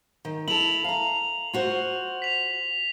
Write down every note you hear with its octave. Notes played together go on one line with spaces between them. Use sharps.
D#3
E4 A4 F7 F#7
F5 A#5
F4 F#4 C5
B6 F7